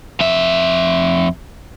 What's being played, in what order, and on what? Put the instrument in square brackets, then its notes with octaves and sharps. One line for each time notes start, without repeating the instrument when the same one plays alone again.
[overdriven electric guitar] F2 E5